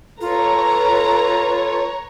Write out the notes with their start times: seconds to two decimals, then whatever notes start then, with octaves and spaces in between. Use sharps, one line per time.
0.21 F4 A4 B4 C#5 A#5